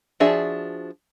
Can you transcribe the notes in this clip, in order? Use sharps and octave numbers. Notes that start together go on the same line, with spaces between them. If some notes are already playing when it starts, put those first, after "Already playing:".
F3 D4 F#4 G#4 E5